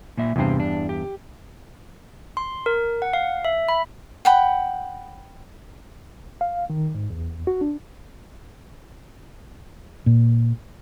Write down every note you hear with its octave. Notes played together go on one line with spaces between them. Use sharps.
A#2 A#3 E5
E2 G2 C3 C4 C5
D4
G4
C6
A#4
F#5
F5
E5
B5
F#5 G5 B5
F5
D#3
G#2
E2
F#4
D4
A#2